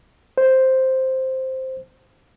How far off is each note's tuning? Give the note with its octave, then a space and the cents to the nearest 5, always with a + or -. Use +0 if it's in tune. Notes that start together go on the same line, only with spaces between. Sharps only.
C5 +0